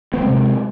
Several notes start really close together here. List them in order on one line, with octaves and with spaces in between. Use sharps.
B3 C4 G#3 C3